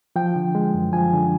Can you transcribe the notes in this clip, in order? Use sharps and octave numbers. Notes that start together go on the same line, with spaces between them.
F3 G5
D3
G#3
F#2
F3 G#5
D3